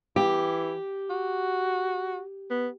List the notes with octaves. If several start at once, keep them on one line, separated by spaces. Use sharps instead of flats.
E3 G4
F#4
B3